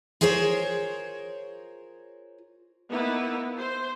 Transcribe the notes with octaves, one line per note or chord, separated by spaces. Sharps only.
F4 G#4 A#4 C5 C#5
A#3 B3 D#4 E4 B4
C5